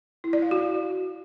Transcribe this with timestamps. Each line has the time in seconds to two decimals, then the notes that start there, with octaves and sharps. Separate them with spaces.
0.24 E4
0.33 D5
0.42 F5
0.51 F#4